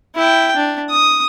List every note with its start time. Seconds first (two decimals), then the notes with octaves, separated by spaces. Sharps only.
0.15 E4 G5
0.56 D4
0.90 D#6